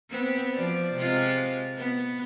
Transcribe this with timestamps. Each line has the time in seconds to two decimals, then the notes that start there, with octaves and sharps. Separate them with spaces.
0.10 B3 C4
0.55 F3 D5
0.94 C3 G#3 F4
1.77 B3